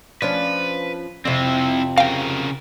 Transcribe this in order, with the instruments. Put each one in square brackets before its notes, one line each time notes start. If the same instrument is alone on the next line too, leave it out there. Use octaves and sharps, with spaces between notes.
[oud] F3 C#4 D4 [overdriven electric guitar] B4
[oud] F2 C3 [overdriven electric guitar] C4 E4
[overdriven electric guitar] C#3 A#4 [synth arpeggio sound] F5 G5